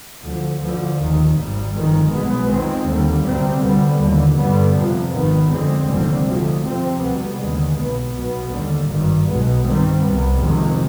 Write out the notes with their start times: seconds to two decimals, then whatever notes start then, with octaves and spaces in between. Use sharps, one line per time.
0.23 D2 D3 F3
0.62 D2 D3 F3
0.99 F1 D#2 D#3
1.37 G#1 G#2 G3
1.74 G1 F2 D#3 G#3
2.11 B1 B2 G#3 B3
2.49 F2 D#3 G#3 C4
2.87 D#2 D3 G3
3.24 D2 C3 G3 C4
3.62 D2 D3 G3 B3
4.00 F1 D#2 D3
4.37 G2 D3 G3 B3
4.74 F2 C3 F3
5.12 G#1 G#2 D#3 B3
5.50 F2 D3 G#3 C4
5.88 F1 D#2 D3 G3 C4
6.25 D2 C3 F3 G#3
6.63 F2 C3 F3 C4
7.00 D2 C3 G3 B3
7.38 D#2 D3 G#3
7.75 B1 B2 B3
8.14 B1 B2 B3
8.50 D#2 D3 G3
8.88 G#1 G2 D#3 G3
9.25 B1 B2 G#3 B3
9.64 G2 D#3 G3 C4
10.01 C2 C3 G3 B3
10.39 F1 F2 C3 D#3 G#3